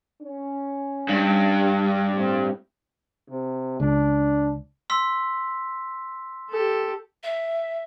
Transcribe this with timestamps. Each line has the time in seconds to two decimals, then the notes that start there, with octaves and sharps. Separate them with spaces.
0.21 C#4
1.08 G2
2.13 A2 C4
3.29 C3
3.80 C#2 D4
4.90 C6 E6 B6
6.50 G4 A4
7.23 E5